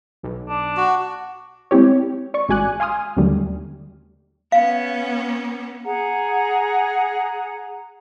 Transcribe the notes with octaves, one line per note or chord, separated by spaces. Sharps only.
B1
D4
F#4
G#3 C4 E4 G4 C#5
D5 C#6
A1 G#3 F#4 G#5 D6 F#6
F5 G#5 C6 D#6 F6
D#2 D3 D#3 F#3 G3 A3
B3 C#4 F5
G#4 F#5 A#5